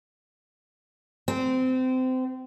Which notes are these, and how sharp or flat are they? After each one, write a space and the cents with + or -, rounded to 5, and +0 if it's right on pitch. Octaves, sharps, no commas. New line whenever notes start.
C4 -25